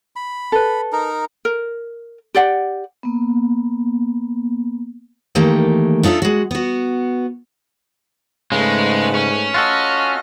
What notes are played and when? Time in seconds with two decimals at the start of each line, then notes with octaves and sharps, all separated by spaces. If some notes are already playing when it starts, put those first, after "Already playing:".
0.16 B5
0.52 A4 B4
0.92 D#4 A#4
1.45 A#4
2.35 G4 D5 F#5
3.03 A#3 B3
5.35 D#3 E3 A3 A#3 G4
6.03 D4 D#4 F4 A4 E5
6.22 G#3 F#4
6.51 B3 F#4
8.52 G#2 C#3 G#3 A3 B4
9.15 C#4
9.54 F4 F#4 A4 D#5